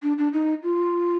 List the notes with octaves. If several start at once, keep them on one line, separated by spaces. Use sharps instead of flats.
D4
D4
D#4
F4